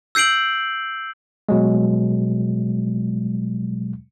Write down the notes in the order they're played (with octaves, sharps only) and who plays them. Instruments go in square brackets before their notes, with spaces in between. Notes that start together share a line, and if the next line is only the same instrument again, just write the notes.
[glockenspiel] E6 G6 C7 D7 F#7
[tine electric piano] B2 F#3 G#3